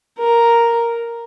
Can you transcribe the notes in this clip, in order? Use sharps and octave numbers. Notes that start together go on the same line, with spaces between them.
A#4